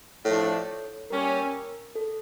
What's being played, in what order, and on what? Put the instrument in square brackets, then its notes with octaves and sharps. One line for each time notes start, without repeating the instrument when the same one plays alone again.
[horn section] A2 F3 A3 D4 [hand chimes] A4 C#5
[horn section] G3 A#3 C#4 [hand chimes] A#4
[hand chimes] A4